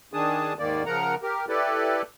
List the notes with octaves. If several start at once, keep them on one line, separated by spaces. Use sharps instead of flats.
D#3 D4 G#4 A5 D#6
D#2 G#2 D#3 A#3 D5
C#3 F3 A#4 F#5 A#5
G4 A#4
E4 G4 A4 B4 D5